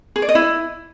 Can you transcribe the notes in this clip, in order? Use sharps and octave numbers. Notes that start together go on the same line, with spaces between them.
G#4
D5
D#5
E4